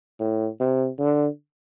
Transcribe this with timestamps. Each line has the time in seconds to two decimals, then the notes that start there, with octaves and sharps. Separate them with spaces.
0.19 A2
0.60 C3
0.99 D3